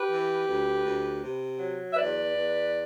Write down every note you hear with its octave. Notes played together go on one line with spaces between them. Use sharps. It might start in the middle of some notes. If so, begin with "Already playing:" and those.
Already playing: G4 B4
E3
D2
D2
C3
F#3
E5
E2 B4 D5
E2